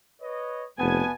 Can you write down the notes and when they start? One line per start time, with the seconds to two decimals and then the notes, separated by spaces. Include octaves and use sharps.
0.21 B4 C#5 D#5
0.79 F1 B2 B3 G#5 A5